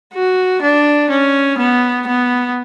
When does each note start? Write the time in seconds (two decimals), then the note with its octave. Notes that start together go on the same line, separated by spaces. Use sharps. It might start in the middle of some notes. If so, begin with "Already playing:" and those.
0.13 F#4
0.62 D4
1.10 C#4
1.58 B3
2.07 B3